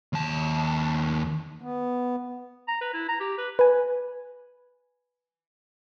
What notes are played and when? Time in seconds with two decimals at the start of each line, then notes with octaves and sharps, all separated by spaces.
0.13 D#2 A5
1.62 B3
2.68 A#5
2.81 B4
2.93 E4
3.09 A#5
3.20 G4
3.38 B4
3.59 B4 G#5